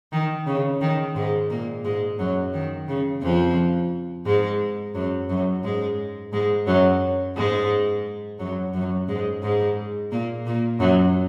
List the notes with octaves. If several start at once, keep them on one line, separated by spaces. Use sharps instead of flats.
D#3
C#3
D#3
G#2 G#3
A#2 A#3
G#2 G#3
F#2 F#3
D#3
C#3
F2 F3
G#2 G#3
F#2 F#3
F#2 F#3
G#2 G#3
G#2 G#3
F#2 F#3
G#2 G#3
F#2 F#3
F#2 F#3
G#2 G#3
G#2 G#3
A#2 A#3
A#2 A#3
F#2 F#3